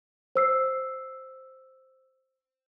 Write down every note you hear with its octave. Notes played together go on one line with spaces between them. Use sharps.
C5 E6 C7